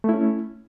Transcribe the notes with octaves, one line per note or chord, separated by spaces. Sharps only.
A3 C#4 E4